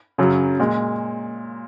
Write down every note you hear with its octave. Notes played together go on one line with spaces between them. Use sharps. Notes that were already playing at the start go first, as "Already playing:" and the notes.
F#2 C#3 F#3
A#2 G#3